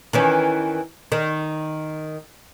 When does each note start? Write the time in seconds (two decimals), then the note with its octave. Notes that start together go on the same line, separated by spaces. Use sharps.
0.13 D#3 E3 C#4
1.12 D#3